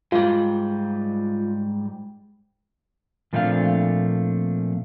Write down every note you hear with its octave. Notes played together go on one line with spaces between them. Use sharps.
G#2 G3 F4
A#2 F3 A3 C4 D4 F5